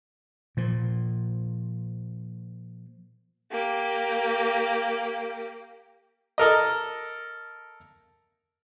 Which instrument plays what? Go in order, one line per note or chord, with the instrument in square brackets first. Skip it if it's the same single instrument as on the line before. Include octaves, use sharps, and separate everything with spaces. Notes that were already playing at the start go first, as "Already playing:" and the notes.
[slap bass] A#2 F3
[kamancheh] A#3 G4
[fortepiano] A4 A#4 D#5